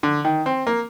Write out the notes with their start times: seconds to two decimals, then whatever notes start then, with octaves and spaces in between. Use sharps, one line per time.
0.03 D3
0.25 D#3
0.46 C4
0.67 A#3